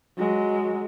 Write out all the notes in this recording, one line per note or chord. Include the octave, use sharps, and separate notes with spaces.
F#3 G#3